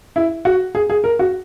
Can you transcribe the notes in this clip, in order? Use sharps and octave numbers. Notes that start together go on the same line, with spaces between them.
E4
F#4
G#4
G#4
A#4
F#4